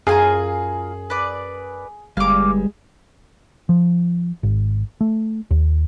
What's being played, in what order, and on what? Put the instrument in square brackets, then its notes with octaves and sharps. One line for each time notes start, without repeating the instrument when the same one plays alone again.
[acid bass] F#2 [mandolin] F4 G#5 A#5 [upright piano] G#4
[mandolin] B4 D5
[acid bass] G1 [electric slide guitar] G3 G#3 [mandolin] F5 D6
[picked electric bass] F3
G#1
A3
D#2